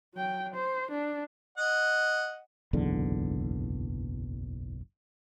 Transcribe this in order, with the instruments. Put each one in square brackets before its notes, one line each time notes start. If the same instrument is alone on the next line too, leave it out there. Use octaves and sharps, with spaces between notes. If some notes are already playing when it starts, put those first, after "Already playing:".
[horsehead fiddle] F#3 G5
C5
D4
[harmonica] D#5 F#5
[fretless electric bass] F#1 B1 E2 D3